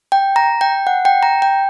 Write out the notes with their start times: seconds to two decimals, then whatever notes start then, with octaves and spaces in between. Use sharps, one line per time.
0.12 G5
0.36 A#5
0.61 G5
0.87 F#5
1.05 G5
1.23 A#5
1.42 G5